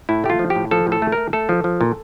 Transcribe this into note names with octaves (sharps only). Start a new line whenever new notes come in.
A2 E4
A3 G4
F4
F3
G4
A2
F3 A4
A2 A4
A3
A#4
A3
A3 A4
F3
F3
A#2